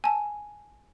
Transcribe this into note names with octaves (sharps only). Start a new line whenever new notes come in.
G#5 A5